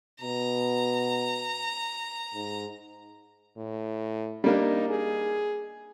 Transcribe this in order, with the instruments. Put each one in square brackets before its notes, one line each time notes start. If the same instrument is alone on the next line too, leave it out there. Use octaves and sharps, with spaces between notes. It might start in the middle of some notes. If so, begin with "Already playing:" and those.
[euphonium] B2 [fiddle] A#5
[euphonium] G#2
[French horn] A2
[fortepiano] G3 A#3 D4 [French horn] D#4
[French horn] G#4